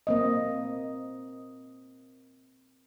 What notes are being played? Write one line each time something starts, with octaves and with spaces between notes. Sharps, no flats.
A#3 C4 D#5